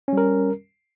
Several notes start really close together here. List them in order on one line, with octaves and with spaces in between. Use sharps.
C#4 G3 A#4